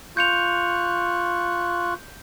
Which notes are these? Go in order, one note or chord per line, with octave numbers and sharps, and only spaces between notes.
F4 C#6 F#6 G6 C#7 F7